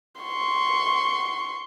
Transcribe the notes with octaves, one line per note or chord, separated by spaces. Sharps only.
C6 C#6